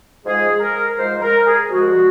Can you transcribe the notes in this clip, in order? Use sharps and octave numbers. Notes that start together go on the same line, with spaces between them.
G#2 F3 G#3 G#4
A#4
G#2 F3 G#3 C5
A#4
G#4
C2 C3 F3 G#3 F#4